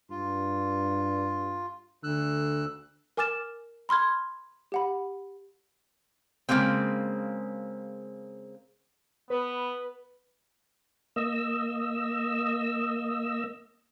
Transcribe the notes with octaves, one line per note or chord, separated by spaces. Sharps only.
G2 F4
D2 D3 E6 F#6
A#4 G#5 D6 F6 A6 E7
B5 C6 F6 G#6
G4 F#5 B5
C#3 F#3 G#3 A#3 C4
B3 B4
A#3 D#5 E6